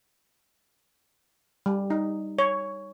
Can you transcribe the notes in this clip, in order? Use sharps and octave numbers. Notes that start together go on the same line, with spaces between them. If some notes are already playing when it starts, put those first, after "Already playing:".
G3
D#4
C#5